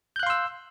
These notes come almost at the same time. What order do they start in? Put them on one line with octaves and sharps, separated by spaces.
G6 F#6 F5 C6 E6